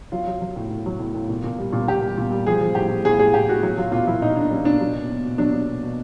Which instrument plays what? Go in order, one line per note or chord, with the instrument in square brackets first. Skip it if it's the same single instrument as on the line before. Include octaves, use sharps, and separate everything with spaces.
[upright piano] F#3 F4
F#3
F#3
A2
A2
F#3
A2
A2
A#2
A#2
G3
A#2
A#2 G4
G3
A#2
G3
F3 G#4
F3
A2 G4
A2
A2 G#4
A2 G#4
A2 G4
A2 F#4
F#3 F#4
F#3 F4
A#2 F4
F#3 E4
A#2 D#4
A#2 D4
F#3 C#4
A#2 D4
F#3
B2
B2
B2
F#3 D4
F#3
B2
B2